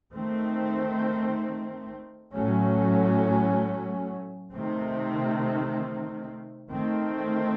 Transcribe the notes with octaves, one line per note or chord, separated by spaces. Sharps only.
D#3 A3 C4
A2 F#3 A3 C#4
C3 D#3 A3 C4
D#3 A3 C4